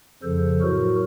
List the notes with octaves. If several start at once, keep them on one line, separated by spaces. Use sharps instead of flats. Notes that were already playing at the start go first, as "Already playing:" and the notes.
F2 C#3 F3 A4 C5
A2 F#3 F#4 A#4